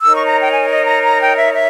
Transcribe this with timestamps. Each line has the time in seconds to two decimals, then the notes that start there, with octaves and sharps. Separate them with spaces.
0.02 D#4 A#4 C#5 E6
0.15 C#6
0.27 A#5
0.41 G5
0.53 G#5
0.69 D#5
0.86 A#5
1.04 A#5
1.20 G5
1.38 E5
1.54 E5